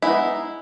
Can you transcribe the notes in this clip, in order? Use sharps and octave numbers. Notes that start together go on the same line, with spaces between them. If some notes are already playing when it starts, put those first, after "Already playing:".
G#3 B3 D#4 E4